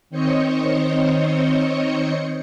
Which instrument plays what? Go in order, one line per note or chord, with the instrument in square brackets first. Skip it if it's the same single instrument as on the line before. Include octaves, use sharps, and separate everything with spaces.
[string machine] D#3 C4 C5 C#5 D#5 C#7